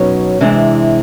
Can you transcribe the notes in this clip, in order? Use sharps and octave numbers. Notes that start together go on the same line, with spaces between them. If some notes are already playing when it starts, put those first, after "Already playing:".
Already playing: B2 F#3 B3 C#4 D#4
C3 E3 G#3 C4 D4